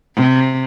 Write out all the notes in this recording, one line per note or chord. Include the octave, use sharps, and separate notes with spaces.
C3